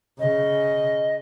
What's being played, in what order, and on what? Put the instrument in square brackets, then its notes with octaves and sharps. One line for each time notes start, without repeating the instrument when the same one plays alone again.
[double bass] C#3 [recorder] D#5